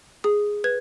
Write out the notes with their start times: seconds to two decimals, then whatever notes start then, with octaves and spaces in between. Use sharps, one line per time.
0.24 G#4 D#6
0.64 B4 G#6